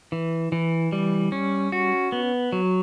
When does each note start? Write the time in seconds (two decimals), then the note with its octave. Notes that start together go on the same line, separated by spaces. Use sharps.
0.12 E3
0.52 E3
0.92 G3
1.32 C#4
1.72 F#4
2.12 B3
2.52 F#3